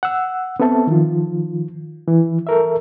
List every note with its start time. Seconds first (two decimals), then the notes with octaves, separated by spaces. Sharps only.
0.03 F#5 E6
0.60 B3 C4 A4 E5 A5
0.87 D#3 F3 F4
2.08 E3
2.47 A4 A#4 E5